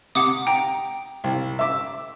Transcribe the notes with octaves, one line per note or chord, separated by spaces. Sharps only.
C3 F#5 D6 D#6
G5 A#5
C2
E5 D6